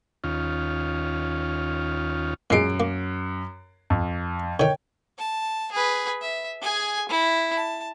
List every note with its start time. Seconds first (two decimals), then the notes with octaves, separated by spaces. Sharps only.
0.24 D#2 C#4 F4
2.50 F#2 A#2 G#3 C7 D7
2.80 A#3
3.90 F2
4.60 D3 D#3 C#5 G5
5.18 A5
5.72 G#4 B4
6.21 E5
6.61 G#4 G#5
7.09 E4
7.55 A5